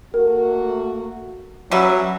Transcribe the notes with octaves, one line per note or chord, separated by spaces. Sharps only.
A3 A#3 F#4 A#4
F#3 G3 C#4 B4 E5